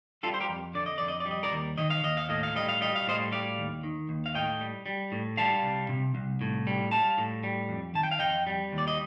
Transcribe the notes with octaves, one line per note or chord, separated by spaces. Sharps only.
G3 F4 A4
C5
G4 A#4
F2
D3 D5
D#5
F2 D5
D#5
D5
G3
D#5
A#4 D5
D#2
D#3 D#5
F5
D#2 D#5
F5
A2 D#5
F5
G3 D#5
F5
G3 D#5
F5
A2 C5 D#5
G3 D5 F5
D#2
D#3
D#2
F5
A2 D#5 G5
G3
G3
A2
G3 F5 A5
C2
C3
C2
A2
G3
G3 F5 A5
A2
G3
F2
D#3 A5
G5
F5
F2 D#5 G5
G3
D#2
D5
D#5